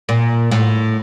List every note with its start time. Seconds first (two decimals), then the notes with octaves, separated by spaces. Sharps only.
0.09 A#2
0.52 A2